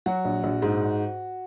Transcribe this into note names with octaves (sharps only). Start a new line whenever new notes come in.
F#3 F#4
A#1
A#1
G#2